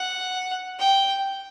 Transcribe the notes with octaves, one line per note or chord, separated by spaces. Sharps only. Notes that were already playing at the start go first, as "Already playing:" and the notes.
Already playing: F#5
G5